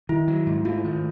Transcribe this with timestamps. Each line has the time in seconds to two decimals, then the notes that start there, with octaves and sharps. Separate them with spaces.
0.09 D#3 E4
0.28 F#3
0.47 G#2
0.65 A3 F4
0.84 D#3